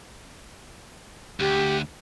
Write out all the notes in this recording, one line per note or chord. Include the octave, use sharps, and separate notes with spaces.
D2 G4